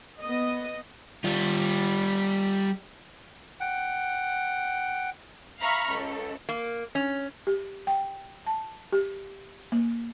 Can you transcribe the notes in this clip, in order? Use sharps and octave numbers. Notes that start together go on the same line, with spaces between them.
B3 D#5
G3 F4
F#5 G5
E5 F5 A#5 B5 C#6 F6
C#2 A4
A#3
C#4
G4
G5
A5
G4
A#3